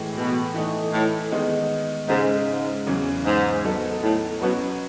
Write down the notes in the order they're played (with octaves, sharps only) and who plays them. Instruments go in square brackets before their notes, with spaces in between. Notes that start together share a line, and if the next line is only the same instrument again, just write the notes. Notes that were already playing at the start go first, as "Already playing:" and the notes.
Already playing: [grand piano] A2 E3 G#3
[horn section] B2
[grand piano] E3 A3 D#4
[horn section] A2
[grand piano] D#3 G#3 B3 D#4
[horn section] G#2 [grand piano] C#3 G#3 D#4
[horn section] G#2
[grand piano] E2 C#3 F#3 C#4 G#4
[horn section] G#2
[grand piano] F#3 B3 D#4 A4
[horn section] A2
[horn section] B2 [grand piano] F#3 C#4 F#4 B4